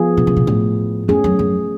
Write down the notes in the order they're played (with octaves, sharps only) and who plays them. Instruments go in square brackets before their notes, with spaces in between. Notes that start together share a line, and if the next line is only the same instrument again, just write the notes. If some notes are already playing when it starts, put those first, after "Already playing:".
Already playing: [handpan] F3 B3 F4 G#4
[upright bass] B2
C#3
B2
A2
[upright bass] F2 [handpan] A3 C#4 G#4
[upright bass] F#2
F#2